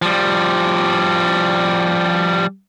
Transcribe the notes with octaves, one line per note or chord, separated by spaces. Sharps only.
F3 G3